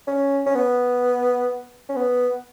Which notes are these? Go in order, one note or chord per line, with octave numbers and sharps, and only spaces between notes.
C#4
C#4
B3
C#4
B3